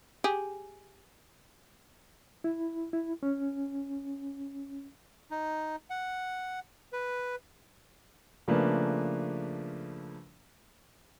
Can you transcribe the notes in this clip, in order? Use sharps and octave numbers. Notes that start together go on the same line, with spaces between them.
G4 G#4
E4
E4
C#4
D#4
F#5
B4
C#3 F3 A3 A#3 D4 B4